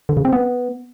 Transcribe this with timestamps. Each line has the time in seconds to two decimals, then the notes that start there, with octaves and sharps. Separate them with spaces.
0.09 D3
0.17 C#3
0.25 C4
0.33 B3